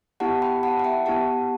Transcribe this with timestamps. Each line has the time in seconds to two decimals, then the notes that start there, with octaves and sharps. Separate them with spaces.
0.20 B3 E4 G4 F#5 A5
0.42 G5 B5
0.63 F#5 A5
0.79 F#5
0.84 E5 G5
1.06 B3 E4 G4 F#5 A5